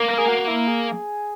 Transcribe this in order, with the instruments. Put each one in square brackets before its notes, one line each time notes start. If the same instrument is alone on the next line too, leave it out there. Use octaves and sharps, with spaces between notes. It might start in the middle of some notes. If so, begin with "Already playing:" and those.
Already playing: [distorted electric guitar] A#3
[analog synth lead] A#4
G#4
F#4
E4
G#4